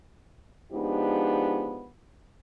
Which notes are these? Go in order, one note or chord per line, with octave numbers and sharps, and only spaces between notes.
F3 G#3 B3 D4 D#4 G4